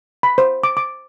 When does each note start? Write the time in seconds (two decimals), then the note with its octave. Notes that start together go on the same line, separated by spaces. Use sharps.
0.23 B5
0.38 C5
0.64 D6
0.77 D6